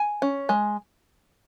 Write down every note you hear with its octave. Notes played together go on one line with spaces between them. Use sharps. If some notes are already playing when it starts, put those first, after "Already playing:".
Already playing: G#5
C#4
G#3